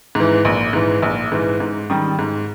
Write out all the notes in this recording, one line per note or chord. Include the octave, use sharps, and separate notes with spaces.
G#2 E3
A#1
G#2 E3
A#1
G#2 E3
G#2
D#3 G3
G#2